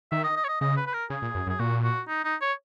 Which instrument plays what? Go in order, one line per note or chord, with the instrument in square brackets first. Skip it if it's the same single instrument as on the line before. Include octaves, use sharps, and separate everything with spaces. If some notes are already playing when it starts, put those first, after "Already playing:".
[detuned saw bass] D#3 [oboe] E5
[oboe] D#5
D#5
C#5
D#5
[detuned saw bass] C#3 [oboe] D#5
[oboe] B4
B4
A#4
[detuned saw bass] C#3 [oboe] G#4
[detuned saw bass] A#2
F#2
F#2
[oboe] G#4
[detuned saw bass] A#2 [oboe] F#4
[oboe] F#4
D#4
D#4
C#5